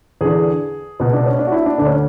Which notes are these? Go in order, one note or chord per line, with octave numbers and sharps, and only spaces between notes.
E2 D3 G#4
C#2 B2
D4
C#4
D4
F#4
E4
D4
D2 D3 D4
C#4